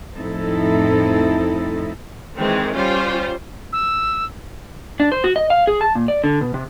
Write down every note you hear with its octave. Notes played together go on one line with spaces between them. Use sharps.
F2 A2 C4 D#4 E4 A4
D#3 E3 G#3 C4
G3 C#4 F4 C5
E6
D4
C5
F#4
D#5
F5
G#4
A5
A#2
D5
D3
B2
C3